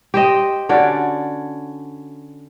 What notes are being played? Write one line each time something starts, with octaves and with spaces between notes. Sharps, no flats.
G4 C5 D#5
D3 C#4 F#4 D5